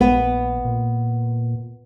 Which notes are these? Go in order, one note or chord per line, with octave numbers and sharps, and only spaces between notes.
A#1 B3
A#2